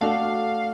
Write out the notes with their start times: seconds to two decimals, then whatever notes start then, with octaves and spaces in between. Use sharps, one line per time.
0.01 A3 D4 F#4 A4 F5